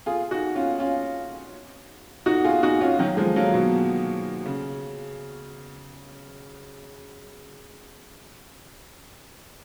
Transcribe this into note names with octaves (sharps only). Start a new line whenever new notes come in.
F4 G#4
D#4 F#4
C#4 F4
C#4 F4
D#4 F#4
F4 G#4
D#4 F#4
C#4 F4
D#3 F#3
F3 G#3
F#3 A#3
B2
C#3